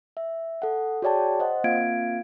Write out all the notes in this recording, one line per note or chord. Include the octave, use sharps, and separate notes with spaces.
E5
A4 F#5
F#4 G#4 C#5 D5 G5 A5
C5 D#5 F#5
A#3 C4 F4 F5 G#6 D7